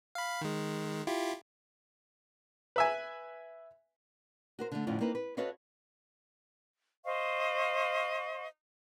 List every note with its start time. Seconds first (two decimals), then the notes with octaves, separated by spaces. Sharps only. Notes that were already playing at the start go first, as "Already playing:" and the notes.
0.15 F5 B5
0.41 D#3 G#3
1.07 E4 F4 G4
2.76 B4 E5 G#5
4.59 F#4 A#4 C5
4.72 D3 A3
4.87 F2 A2 D3 C#4 F4
5.01 A#3 C4 D#4 B4
5.15 B4
5.37 F#4 A4 B4 C#5 D#5 F5
7.05 C5 D#5 F5 C#6